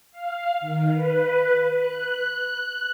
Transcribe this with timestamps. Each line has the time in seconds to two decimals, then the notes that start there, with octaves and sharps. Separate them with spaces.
0.11 F5
0.60 D#3
0.92 B4
1.79 F#6